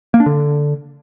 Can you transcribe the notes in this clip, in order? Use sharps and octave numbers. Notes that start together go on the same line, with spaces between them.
A#3
D4
D3